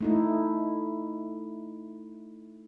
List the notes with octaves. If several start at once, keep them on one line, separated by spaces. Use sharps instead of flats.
A3 D#4 E4